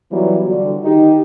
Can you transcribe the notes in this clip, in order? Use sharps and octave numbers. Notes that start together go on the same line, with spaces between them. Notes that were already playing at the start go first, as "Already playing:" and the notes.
E3 F#3 G3 B3 F4 F#4
D3 G3 F#4
D#3 D#4 G4